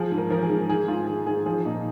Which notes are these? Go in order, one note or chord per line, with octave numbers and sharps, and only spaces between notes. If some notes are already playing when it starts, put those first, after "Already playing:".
Already playing: F3 G#4
G#2
A#4
F3 A#4
G#4
G#2
D#3 G#4
G#2 F4
D#3 G#4
G#2 G#4
F3 G#4
A#2 D#4